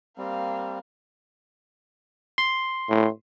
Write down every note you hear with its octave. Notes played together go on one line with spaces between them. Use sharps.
G3 A#3 C4 F5
C6
A2